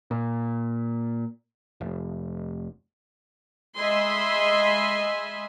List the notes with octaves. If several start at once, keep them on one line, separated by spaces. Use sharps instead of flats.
A#2
F1
G#3 D#5 E5 G#5 B5 C6